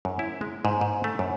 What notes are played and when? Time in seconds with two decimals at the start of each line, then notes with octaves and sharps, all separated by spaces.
0.05 F#2
0.19 E4
0.41 G#3
0.65 G#2
0.81 G#2
1.04 A3
1.19 F#2